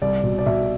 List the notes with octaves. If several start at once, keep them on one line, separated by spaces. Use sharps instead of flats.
C2 D5
B2
D5
B2 E5